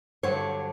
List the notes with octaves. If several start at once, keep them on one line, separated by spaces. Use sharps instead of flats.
G2 D3 F#3 C#5